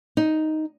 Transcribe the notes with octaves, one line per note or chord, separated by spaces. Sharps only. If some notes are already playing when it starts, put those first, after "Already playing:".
D#4